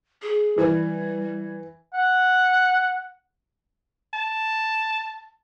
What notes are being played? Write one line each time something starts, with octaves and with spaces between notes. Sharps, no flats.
G#4
E3 G3
F#5
A5